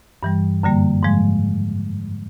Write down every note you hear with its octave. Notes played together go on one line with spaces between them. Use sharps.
G2 E3 G3
F#2 D3 G3 A#3
G#2 F3 G#3